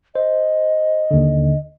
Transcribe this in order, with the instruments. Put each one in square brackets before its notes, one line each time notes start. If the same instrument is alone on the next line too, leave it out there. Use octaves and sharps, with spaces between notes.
[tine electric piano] C5 [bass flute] D#5
[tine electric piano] D#2 D3